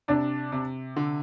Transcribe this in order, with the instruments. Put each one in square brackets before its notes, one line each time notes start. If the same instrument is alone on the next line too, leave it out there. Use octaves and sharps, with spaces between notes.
[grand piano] C3 [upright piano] D4
[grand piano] C3
D3